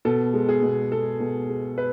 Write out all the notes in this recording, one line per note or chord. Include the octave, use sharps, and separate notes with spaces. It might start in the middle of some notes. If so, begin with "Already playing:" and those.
B2 A4
G#3
G#4
B2
G#3 A4
B2
G#3
B4